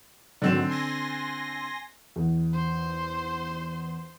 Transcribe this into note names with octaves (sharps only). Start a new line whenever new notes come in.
G#2 D3 D#3 F#3 C4 E7
G#5 C6 A#6
E2
C5 C6